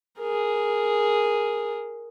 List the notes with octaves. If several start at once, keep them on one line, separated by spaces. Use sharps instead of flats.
G#4 A#4